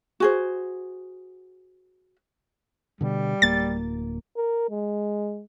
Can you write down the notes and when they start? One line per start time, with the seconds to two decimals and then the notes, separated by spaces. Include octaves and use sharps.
0.20 F#4 G#4 C5
3.01 B2 D3 G3
3.42 D1 A#3 A6
4.37 A#4
4.71 G#3